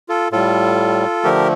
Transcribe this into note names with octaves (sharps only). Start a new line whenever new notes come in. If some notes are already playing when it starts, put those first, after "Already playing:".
F4 A4
A2 G3 F4 A4
D3 F3 A3 G4 A#4